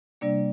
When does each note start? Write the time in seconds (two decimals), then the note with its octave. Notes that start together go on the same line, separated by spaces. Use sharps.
0.21 C3 G3 A#3 D4 D5